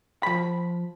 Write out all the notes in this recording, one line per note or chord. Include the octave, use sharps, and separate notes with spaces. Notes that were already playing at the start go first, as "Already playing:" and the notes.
F3 B5